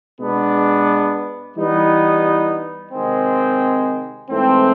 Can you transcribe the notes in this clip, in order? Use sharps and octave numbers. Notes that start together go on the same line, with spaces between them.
B2 G#3 B3 D4
E3 G3 B3 D#4
C3 D#3 G#3 C4
G#2 E3 A3 C4